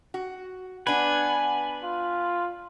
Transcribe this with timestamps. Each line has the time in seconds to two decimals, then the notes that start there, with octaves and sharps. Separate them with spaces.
0.14 F#4
0.87 B3 D4 B4 F#5 G#5
1.84 F4